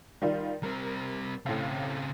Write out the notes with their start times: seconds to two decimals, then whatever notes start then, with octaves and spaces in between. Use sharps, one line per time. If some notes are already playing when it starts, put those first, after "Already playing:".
0.22 D#3 G3 F4
0.63 G3 C4 A#4
1.46 A2 C#3 C4 F5